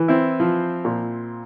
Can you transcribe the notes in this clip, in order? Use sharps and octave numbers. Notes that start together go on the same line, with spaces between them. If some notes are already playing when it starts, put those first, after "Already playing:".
Already playing: E3
C4 E4
F3
A#2